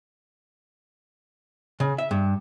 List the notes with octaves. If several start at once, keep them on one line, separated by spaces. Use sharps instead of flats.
C#3
E5
G2